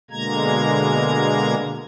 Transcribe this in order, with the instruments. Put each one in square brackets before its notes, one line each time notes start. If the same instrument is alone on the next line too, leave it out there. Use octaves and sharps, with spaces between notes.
[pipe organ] B2 D3 G#3 A#3 A#5 G#6